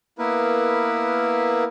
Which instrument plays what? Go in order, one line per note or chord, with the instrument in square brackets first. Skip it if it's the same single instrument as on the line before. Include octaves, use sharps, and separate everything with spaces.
[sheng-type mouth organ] A#3 B3 E4 A#4 B4